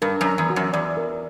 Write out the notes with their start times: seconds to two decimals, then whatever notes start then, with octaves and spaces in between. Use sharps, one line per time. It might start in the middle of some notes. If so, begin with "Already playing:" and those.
0.02 G2 A#4
0.21 F#2 A#5
0.38 E2
0.50 F#4
0.56 F#2
0.73 E2 D5
0.97 A#4